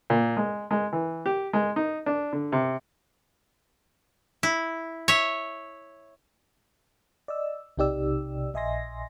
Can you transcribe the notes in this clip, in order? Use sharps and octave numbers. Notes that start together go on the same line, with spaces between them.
A#2
G#3
G#3
E3
G4
G#3
D#4
D4
D3
C3
E4
C#5 E5
D5 D#5 E6
B1 C3 D#4 G4 D5 E6
A#1 D#5 E5 G#5 C6 A#6